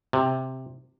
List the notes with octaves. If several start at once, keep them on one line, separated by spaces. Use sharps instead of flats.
C3